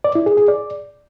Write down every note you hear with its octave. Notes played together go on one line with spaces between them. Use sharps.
D5
E4
G#4
G#4
D5